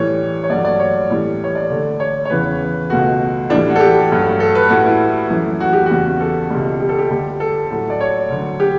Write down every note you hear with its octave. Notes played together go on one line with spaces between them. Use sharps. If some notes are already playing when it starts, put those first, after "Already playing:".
Already playing: A2 E3 G3 C#5
C#5
G2 F#3 A3 D5
D5
C#5
A2 E3 G3
C#5
D5
D2 D3 A3
C#5
C#5
E2 C#3 E3 B4
C#2 B2 A3 F#4
A2 E3 G3 D4
F#4
A4
G4
G2 F#3 A3
A4
B4
A2 G3 F#4
E4
F#2 E3 A3
F#4
G4
E2 C#3 G3 F#4
A4
C#2 B2 G3
G4
A4
G4
D2 D3 G3
A4
A2 F#3 A3
D5
C#5
D2 D3 F#3
G4